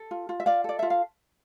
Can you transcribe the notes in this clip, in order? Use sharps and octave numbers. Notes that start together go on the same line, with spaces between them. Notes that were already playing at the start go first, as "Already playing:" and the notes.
Already playing: A4
F4
F4
E5
F4 D5 F5
A4 D5
F4 E5
F5